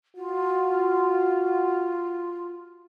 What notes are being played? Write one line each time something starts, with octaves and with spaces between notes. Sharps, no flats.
F4 F#4